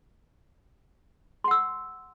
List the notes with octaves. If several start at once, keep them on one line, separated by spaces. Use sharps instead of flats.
F#5 C6 E6